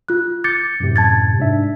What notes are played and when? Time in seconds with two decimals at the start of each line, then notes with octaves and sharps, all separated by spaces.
0.09 F4 F#6
0.44 D6 G6 A6 C#7
0.80 F#2 A2 C3
0.96 A5 G#6 A6
1.39 G#2 D4 E5